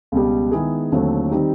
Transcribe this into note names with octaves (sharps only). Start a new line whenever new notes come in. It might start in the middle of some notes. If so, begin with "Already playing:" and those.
C#2 B2 G3
D#3 G#3 B3 E4 G#4
D#2 D3 F#3 A3 C4
D#3 G3 C4 D#4 G4